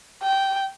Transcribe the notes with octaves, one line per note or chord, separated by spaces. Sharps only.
G5